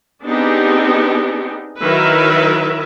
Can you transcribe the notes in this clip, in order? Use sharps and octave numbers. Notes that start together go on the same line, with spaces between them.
B3 C4 D4 D#4 G4 G#4
D#3 F#3 E4 A#4 B4 E5